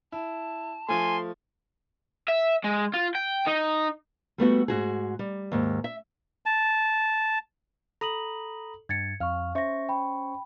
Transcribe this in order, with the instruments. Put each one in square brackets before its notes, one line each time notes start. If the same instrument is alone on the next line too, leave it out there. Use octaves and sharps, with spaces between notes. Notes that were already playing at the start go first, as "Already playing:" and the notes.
[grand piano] E4 [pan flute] A5
[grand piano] F3 A3 [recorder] G#5 [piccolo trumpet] C6
[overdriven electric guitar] E5
G#3
F4
G5
D#4
[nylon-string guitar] G3 A3 B3 F#4
G#2 F#4 G#4
G3
D#2 G#2
E5
[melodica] A5
[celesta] A4 F#7 [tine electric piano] A#5 B5 D#6
[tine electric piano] G2 [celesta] G#6 A6 C#7
[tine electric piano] F2 F6 [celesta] F5 C#6
[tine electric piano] C#4 C5 C#6 [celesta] E5 A#6
[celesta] G5 B5